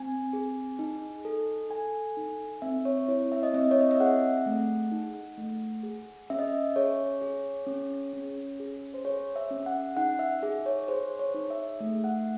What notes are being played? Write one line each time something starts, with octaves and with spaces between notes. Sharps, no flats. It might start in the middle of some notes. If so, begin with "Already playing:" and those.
Already playing: C4 G#5
G#4
D#4
A4
A4 G#5
D#4
C4 E5
C#5
E4 C#5
E5
D#5
C4 E5
C#5
D#5
E5
G#4 F#5
A3
D#4
A3
G#4
C#4 E5
D#5
E5
G#4 C#5
G#4
C#4
C#4
G#4
C5
G#4 C#5
E5
C#4
F#5
D#4 F#5
E5
G#4
C#5
G#4 C5
C#5
D#4
E5
A3 E5
F#5